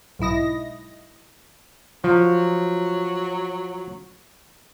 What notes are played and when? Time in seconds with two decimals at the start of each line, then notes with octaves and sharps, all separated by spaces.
0.19 B1 G#2 E4 D#5 A#6
2.04 F3 F#3